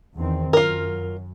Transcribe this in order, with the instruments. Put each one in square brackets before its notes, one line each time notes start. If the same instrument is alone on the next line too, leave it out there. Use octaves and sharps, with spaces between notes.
[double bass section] E2 D#3 C4
[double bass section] F#2 [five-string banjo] F4 A#4